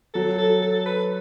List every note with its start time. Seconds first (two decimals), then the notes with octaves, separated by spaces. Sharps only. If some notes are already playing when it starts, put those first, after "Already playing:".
0.14 F#3 A4
0.38 A4
0.62 A4
0.86 B4